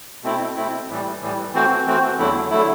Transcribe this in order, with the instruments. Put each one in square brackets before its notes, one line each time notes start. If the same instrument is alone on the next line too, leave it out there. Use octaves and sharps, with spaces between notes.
[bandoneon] B2 A3 C4 E4
B2 A3 C4 E4
A2 E3 G3
A2 E3 G3
E3 A3 C4 F#4 C5
E3 A3 C4 F#4 C5
E2 D3 F#3 A3 E4
D3 F#3 A3 E4